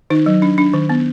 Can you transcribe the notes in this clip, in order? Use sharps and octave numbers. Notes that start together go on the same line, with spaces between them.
D#3 D#4
F#3
D4
D4
D#3
B3